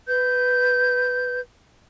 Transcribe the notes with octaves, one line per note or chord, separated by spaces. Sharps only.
B4 G6